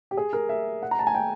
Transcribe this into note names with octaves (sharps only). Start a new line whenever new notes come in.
G4
G#4
A#4
E5
F#5
A#5
A5
G#5
G5